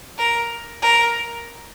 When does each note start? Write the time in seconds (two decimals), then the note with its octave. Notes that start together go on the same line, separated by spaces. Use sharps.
0.18 A#4
0.82 A#4